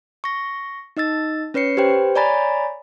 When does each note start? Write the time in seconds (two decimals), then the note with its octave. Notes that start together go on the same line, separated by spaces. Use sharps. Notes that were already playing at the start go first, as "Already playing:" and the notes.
0.24 C#6 A#6
0.97 D#4 D#5 E6 A6
1.54 C#4 B4 C#5 C7 C#7
1.77 G4 B4 C5 G5
2.15 C#5 D5 G#5 A#5 B5 A6